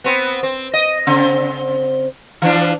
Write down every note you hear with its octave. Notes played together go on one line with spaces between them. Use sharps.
B3 C4
C4
D#5
C#3 C4
E3 F3 D4